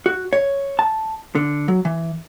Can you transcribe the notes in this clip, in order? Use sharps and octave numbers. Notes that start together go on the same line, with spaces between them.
F#4
C#5
A5
D3
F#3
E3